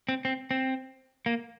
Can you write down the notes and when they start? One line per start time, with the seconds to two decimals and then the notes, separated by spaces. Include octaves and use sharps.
0.09 C4
0.25 C4
0.51 C4
1.26 A#3